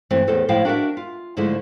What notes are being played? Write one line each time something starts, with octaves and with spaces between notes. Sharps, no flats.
G2 E3 A3 C4
E2 A2 A4 C5
A2 F3 E4 F5 G5
D4 F#4 A#4 E5
F4
G#2 D3 F3 G#3 A3 E4